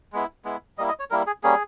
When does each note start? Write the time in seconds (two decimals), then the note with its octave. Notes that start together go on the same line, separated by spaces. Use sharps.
0.13 G#3 B3 E4
0.45 G#3 B3 E4
0.78 G3 A#3 E4 D#5
0.89 D#5
0.99 C#5
1.10 G3 A#3 E4 A#4
1.27 G#4
1.43 G3 A#3 C#4 G#4